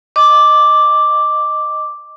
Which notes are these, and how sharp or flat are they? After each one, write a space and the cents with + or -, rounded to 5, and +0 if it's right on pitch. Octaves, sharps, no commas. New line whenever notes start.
D#5 +0 D6 +0